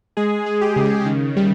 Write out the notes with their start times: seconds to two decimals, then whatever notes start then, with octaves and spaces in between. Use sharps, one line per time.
0.17 G#3 G#4
0.46 G#3
0.61 G4
0.76 C#3
1.06 D#3
1.36 G3